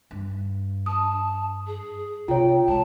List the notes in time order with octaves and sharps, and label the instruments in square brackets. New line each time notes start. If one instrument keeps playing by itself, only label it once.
[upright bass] G2
[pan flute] A5 [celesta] D#6
[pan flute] G#4
[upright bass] C3 [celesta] F4 C#5 [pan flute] G5
[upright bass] G#3 [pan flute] A5